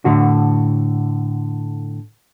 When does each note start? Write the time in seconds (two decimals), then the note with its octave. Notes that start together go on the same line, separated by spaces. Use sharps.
0.05 A2 D3 F#4